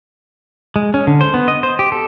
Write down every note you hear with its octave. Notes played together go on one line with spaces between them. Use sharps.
G#3
C#4
D3
C5
B3
D#5
C5
G4
A4